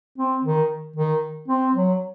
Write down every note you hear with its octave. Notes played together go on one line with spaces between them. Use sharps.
C4
D#3
D#3
C4
F#3